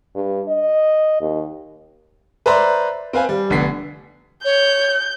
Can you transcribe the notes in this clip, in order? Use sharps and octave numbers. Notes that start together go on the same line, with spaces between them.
G2
D#5
D#2
B4 C5 D5 E5 A#5 C6
C4 B4 F5 G#5
G3
F1 D3 B3 B6 C7
C#5 G6